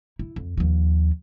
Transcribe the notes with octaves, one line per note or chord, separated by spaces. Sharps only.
E4
F2
D#2 F3